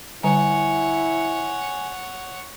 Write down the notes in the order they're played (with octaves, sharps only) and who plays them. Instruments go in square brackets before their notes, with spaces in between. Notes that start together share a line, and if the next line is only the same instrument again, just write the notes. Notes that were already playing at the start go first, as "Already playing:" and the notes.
[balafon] D3 G3 A#5 [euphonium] E4 [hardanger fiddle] C#5 F#5 [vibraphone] G#5